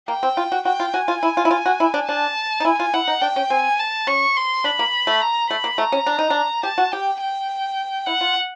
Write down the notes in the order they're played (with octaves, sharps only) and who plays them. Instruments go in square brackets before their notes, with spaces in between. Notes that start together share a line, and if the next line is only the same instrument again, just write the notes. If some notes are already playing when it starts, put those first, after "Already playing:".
[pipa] A#3 [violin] G5
[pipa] C4
F4
F#4
[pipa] F#4 [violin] G5
[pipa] F4
[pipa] F#4 [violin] G#5
[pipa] F4
E4
F4
E4
F4
F#4
E4
D4
[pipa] D4 [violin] A5
[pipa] D#4
[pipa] E4 [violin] G#5
[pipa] F4
[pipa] E4 [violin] F#5
[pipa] D#4
[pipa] D4 [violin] G5
[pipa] C#4
[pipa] C4 [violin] G#5
[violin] A5
[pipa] C#4 [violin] C#6
[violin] C6
[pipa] D4 [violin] B5
[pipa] A#3
A3
[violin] A#5
[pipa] A3 [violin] B5
[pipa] A#3
[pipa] A3 [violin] A#5
[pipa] C#4
D4
D#4
D4
[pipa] G4 [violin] A5
[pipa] F#4
[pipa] G4 [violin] G5
[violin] G5
[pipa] E4 [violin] F#5
[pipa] F4